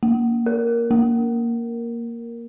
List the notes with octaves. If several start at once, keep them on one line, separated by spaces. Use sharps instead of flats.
A#3
A#4
A#3